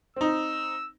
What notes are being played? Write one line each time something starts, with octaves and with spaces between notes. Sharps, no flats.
C4 D#4 E6